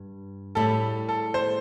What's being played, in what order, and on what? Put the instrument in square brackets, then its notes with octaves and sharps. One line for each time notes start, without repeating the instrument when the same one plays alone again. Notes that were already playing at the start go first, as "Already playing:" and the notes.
Already playing: [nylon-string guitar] G2
[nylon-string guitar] A2 G3 E4 G4 [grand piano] A4
[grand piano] A4
C5